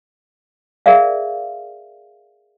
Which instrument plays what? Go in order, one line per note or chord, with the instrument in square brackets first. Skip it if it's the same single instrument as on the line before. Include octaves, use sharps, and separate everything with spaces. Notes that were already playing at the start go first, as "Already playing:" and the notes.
[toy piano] G#4 A#4 D5 E5 F5